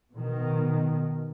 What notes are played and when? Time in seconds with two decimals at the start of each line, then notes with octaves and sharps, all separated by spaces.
0.13 B2 D#3